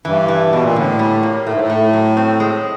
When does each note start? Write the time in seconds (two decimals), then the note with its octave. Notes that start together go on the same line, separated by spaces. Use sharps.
0.05 G2 E3
0.28 E3
0.50 B2 E3
0.62 A#2
0.75 A2 D3
0.99 G3
1.23 A#3
1.46 A2 A3
1.53 G#2
1.61 A2
1.70 A3
1.93 F#3
2.17 C4
2.40 G#3